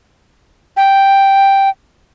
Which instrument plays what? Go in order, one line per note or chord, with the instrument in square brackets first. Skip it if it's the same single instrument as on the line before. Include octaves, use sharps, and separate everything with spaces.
[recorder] G5